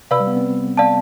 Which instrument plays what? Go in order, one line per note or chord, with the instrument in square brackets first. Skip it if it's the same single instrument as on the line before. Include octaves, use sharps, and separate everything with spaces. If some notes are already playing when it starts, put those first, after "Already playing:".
[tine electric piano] C3 [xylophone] B4 D5 F5 B5 E6
[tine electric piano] G3
B3
C4
[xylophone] D5 F5 A5